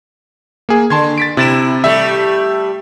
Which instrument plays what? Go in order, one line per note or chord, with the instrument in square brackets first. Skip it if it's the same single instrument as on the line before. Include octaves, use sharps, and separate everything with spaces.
[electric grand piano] A#3 G#4
[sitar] D3 [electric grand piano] A5 C6 G#6
[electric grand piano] A6 B6 D7
[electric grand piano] C3 A6 E7 [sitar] E4
[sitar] G3 A3 [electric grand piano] E5